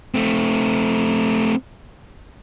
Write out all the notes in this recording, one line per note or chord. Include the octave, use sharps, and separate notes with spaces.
A3 C4